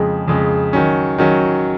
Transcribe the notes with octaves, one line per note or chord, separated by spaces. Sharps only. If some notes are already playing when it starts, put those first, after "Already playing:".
Already playing: F2 C#3 G#3
F2 C#3 G#3
D#3 F#3 C#4
D#3 F#3 C#4